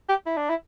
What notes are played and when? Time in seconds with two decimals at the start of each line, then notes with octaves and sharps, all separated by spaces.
0.09 G4
0.26 E4
0.37 D4
0.49 E4